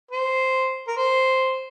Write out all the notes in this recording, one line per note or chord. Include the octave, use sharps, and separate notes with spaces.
C5
A#4
C5